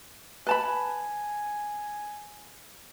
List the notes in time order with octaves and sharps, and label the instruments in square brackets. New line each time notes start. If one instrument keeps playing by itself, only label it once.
[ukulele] B4 A5 B5 [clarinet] G#5